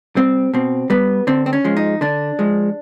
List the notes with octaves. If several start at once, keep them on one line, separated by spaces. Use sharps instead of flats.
G3 C4
B2 C4
G3 B3
D3 C4
C4
C#4
F3 G#3
D#4
D3 D4
F3 G#3